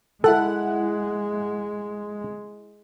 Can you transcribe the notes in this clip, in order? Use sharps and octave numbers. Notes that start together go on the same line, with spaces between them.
G#3 E4 A4 F#5 F#6